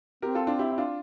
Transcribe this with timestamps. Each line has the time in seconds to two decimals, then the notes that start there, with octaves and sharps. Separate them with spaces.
0.22 C4 G4 A#4
0.35 F4 A4
0.47 D4 F4
0.59 E4 G4
0.71 E4
0.78 D4 F4